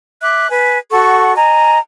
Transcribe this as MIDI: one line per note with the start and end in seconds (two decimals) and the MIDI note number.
0.21 0.49 76
0.21 0.49 86
0.21 0.49 90
0.50 0.78 71
0.50 0.78 80
0.91 1.34 66
0.91 1.34 69
0.91 1.34 78
0.91 1.34 85
1.36 1.78 75
1.36 1.78 80
1.36 1.78 82